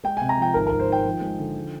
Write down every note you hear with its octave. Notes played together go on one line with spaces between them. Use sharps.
G#3 G5
C3 G#5
A#5
F3 G5
G#1 A#4
G#1 A#4
C5
D#3 G5
F3
G#3
D3
F3